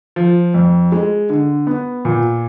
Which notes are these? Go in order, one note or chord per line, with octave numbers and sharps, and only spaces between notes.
F3
F2
G#3
D3
B3
A#2